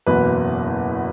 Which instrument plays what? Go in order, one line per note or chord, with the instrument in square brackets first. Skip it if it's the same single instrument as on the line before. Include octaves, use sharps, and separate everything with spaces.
[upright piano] F#1 E2 B2 B4